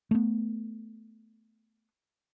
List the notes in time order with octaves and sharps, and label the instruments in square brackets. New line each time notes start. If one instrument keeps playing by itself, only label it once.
[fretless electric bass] A3 B3